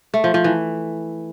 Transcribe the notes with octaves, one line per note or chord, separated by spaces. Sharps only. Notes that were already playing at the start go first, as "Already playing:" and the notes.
A3
F3
F3
E3